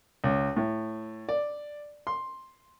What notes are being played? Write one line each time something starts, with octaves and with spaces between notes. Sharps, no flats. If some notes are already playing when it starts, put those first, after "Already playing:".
C#2
A2
D5
C6